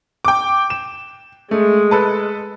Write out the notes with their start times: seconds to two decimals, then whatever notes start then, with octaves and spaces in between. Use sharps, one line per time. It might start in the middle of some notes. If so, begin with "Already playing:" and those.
0.25 G5 D6
0.70 E7
1.51 G#3 A3
1.91 A4 B4 A5